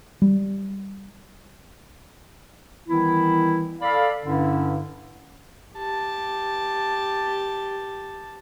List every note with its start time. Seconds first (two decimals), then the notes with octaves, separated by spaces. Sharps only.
0.22 G3
2.88 D#3 E3 G3 B3 E4
3.82 A4 D5 F5 B5
4.24 G2 D3 C#4 E4
5.74 G4 A5